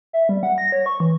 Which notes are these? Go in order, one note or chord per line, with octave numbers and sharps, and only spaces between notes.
E5
G3
F#5
A#6
C#5
C#6
E3